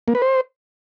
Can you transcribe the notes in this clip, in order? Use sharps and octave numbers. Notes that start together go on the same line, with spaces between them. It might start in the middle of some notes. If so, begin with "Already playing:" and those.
A#3
B4
C5